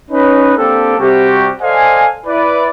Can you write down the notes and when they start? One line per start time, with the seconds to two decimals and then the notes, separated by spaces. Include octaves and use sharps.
0.11 C#4 D#4 B4
0.57 A#3 C4 D4 G4 A4
0.98 C3 G3 F#4 G4
1.62 A4 C5 D5 D#5 F5 G#5
2.26 E4 B4 D5